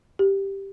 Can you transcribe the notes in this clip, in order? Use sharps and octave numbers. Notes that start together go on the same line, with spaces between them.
G4